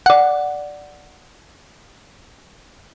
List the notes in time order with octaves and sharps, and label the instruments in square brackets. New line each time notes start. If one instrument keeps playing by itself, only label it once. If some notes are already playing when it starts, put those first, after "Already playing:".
[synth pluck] D5 F#5